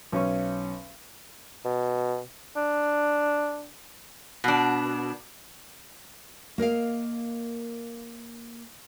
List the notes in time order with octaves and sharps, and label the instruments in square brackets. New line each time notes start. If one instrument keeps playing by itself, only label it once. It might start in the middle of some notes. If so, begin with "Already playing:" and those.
[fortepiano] B1 C#4 C#6
[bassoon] B2
D4
[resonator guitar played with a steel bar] B2 D4
[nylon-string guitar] A#3 A#4 D#5 F5